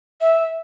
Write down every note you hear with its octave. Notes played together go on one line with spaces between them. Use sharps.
E5